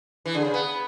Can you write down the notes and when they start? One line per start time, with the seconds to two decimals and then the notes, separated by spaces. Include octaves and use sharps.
0.25 E3 G#4
0.35 D3
0.45 C#3
0.54 B3